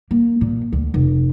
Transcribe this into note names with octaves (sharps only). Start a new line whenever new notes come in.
A#3
A#2
D2
F1